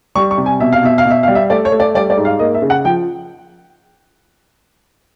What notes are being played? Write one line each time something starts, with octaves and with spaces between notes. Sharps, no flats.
G3 C#6
C#6
C3
G#5
B2 E5
F5
B2 E5
F5
B2
E5
G3 F5
E5
A3 D5
C#5
A3
D5
G3 D5
D5
G#2
F5
A#3 D#5
E5
C#3
F#5
F3 G5